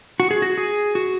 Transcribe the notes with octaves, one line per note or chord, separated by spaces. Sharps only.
F#4
G#4
F#4
G#4
F#4